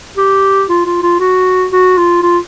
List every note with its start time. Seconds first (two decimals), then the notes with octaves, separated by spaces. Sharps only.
0.17 G4
0.69 F4
0.86 F4
1.03 F4
1.20 F#4
1.72 F#4
1.97 F4
2.23 F4